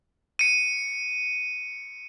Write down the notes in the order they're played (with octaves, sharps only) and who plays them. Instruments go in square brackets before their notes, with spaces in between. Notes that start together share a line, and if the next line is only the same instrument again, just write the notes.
[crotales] C#7 D#7